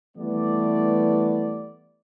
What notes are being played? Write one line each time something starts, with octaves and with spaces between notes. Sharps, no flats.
E3 G3 A3 B3 D5